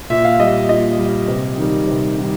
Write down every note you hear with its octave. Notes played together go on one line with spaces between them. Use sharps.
A#2 E5
F5
G3 D#5
A#2 D#5
G3
C3
D#3 G3
C3
D#3 G3